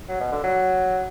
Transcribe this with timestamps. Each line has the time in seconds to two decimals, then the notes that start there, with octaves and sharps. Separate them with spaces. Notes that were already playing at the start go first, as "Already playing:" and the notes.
0.09 F#3
0.20 B2
0.32 D3
0.44 F#3